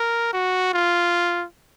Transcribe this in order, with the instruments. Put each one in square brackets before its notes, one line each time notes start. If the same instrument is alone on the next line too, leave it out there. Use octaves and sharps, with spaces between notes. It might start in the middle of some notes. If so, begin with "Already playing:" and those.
Already playing: [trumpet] A#4
F#4
F4